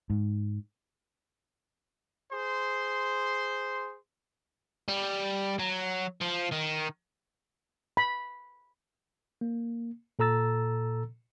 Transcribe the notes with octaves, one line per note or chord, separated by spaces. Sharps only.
G#2
G#4 C5 C6
G3
F#3
F3
D#3
B5
A#3
A#2 A4 A#5 E6 A6